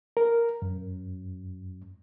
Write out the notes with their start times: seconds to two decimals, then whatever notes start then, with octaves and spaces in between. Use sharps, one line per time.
0.17 A#4
0.62 F#2